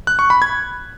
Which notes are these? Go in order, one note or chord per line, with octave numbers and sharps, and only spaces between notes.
F#6
C#6
B5
G#6